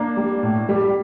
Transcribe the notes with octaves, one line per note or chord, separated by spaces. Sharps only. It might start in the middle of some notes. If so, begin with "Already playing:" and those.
Already playing: A#3 D4
G3
A2
G3